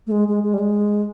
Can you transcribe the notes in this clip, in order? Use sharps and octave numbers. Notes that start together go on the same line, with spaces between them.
A3
G#3
G#3
G#3
G3
G#3